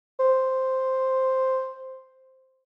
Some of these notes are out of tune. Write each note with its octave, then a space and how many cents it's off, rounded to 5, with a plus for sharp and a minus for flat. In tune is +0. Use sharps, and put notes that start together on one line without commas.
C5 +0